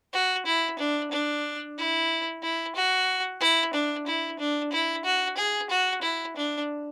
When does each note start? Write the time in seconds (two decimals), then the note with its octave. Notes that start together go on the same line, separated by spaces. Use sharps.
0.13 F#4
0.46 E4
0.79 D4
1.11 D4
1.78 E4
2.43 E4
2.75 F#4
3.40 E4
3.73 D4
4.06 E4
4.39 D4
4.72 E4
5.05 F#4
5.37 G#4
5.70 F#4
6.02 E4
6.36 D4